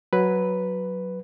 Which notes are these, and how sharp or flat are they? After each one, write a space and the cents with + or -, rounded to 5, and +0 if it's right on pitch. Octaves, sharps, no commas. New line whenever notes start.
F#3 +0 B4 +0